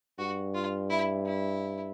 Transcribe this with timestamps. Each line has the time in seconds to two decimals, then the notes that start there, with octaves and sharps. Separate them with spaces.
0.19 G2 F#4
0.54 F4
0.89 E4
1.25 E4